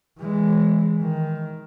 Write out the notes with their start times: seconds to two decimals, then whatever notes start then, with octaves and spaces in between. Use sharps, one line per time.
0.20 E3 G#3
1.01 D#3